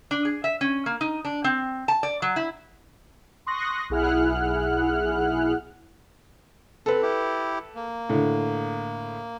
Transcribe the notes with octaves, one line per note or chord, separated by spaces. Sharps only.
D4
G#4
E5
C#4
A#3
D#4
D4
C4
A5
D5
F#3
E4
C6 C#6 D#6 F#6 A#6
B1 E4 G#4 F#5 F6 F#6
C4 A4 B4
E4 G4
A#3
A2 D3